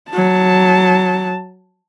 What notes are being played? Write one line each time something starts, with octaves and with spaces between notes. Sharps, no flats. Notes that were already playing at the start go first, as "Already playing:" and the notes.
F#3 A5